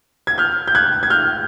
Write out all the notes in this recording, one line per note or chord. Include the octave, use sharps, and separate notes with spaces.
G#6
F6 G6
G6
F#6 G#6
G#6
F6 G6